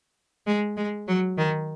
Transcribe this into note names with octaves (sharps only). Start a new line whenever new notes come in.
G#3
G#3
F#3
D#3